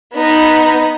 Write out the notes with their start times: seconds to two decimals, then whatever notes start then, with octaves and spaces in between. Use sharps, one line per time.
0.14 B3 D#4